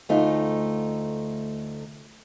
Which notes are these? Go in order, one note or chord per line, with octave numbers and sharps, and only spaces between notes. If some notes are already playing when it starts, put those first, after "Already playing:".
D2 A3 D#4 F4